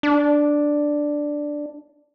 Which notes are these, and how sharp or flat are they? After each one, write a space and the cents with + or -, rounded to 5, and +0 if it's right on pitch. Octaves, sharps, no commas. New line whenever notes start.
D4 +0